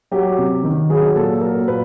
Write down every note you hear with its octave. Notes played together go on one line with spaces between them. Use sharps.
F#3 G4
C3
D#3
F#3 G#4
A#2 A4
F#3 A#4
A#2 B4